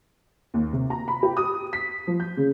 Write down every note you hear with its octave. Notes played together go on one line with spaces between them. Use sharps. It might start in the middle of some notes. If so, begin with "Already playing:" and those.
D#2
C3
A#5
B5
G4
D#6
B6
F3
G6
C#3